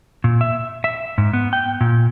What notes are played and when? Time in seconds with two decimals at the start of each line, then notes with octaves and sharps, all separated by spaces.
0.24 A#2
0.41 E5
0.84 E5
1.18 G#2
1.33 B3
1.53 G5
1.81 A#2